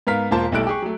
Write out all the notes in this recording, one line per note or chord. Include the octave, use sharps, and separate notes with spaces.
G#2 B3 A#4 F5 F6 B6
E1 A#3 F4 C5 A5
B1 G3 A3 E4 F#6 D7
G4 G#4 C#6
F#3 A3